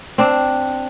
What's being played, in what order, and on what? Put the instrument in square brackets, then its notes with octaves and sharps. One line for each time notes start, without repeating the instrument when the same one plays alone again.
[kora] C4 D4